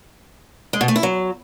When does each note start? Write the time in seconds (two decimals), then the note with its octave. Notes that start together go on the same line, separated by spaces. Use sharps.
0.73 G#3
0.81 B2
0.88 A3
0.96 E4
1.03 F#3